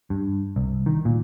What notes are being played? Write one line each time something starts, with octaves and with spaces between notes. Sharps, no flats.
G2
C2
D#3
A#2